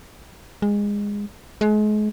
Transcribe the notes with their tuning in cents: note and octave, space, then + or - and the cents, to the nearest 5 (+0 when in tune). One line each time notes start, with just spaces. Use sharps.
G#3 -20
G#3 +35